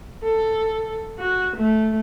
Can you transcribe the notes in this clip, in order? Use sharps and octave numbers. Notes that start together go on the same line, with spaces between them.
A4
F#4
A3